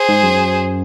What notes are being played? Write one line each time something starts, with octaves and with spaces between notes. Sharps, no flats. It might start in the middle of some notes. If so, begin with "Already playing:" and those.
Already playing: G#4 C5
G#2
F#2